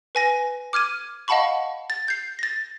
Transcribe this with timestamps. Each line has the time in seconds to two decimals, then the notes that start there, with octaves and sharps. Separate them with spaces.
0.15 B4 G#5 A#6
0.73 D6 F6 G#6 D#7
1.28 D#5 F5 F#5 A5 B5 C#6
1.90 A6
2.08 G6 C7
2.39 A6 A#6